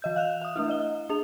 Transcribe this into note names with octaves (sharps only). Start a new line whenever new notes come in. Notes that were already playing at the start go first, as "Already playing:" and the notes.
E3 D#5 G6
F5 F#6 E7 F7
E5 D#6
A3 D4 E4
D#5 G7
D4 G#4 F7